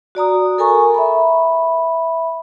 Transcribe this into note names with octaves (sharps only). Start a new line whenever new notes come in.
F#4 D5 A#5 D#6
A4 A#4 G#5 A#5 C#6
E5 B5